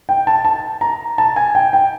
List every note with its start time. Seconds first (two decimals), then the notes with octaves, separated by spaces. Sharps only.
0.09 G5
0.27 A5
0.45 A5
0.81 A#5
1.18 A5
1.36 G#5
1.55 G5
1.73 G5